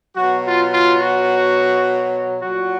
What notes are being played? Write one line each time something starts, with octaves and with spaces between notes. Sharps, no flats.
B2 F#3 F#4
F4
F4
F#4
A#2 F#3 F#4